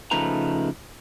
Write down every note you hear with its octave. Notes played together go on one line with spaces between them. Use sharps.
C#3 F3 A3 D#4 B4 A#5